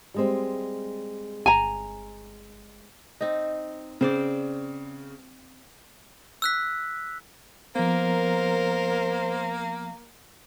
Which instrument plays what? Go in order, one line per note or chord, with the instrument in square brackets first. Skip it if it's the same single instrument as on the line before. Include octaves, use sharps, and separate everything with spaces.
[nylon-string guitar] G3 G#3 C4
[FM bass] G1 [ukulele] G#5 A#5
[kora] C4 D#4
[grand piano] C#3 [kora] C4 C5 D5
[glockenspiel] E6 F#6 B6
[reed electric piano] F3 B3 [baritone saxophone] A#3 [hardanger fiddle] A#4 [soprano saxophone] C5